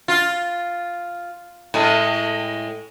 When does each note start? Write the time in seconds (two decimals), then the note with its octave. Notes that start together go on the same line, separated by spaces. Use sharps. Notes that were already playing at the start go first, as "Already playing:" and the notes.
0.08 F4
1.74 A2 G#3